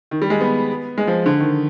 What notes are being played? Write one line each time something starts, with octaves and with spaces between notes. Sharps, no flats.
D#3
G3
G#3
B3
G#3
F3
D3
D#3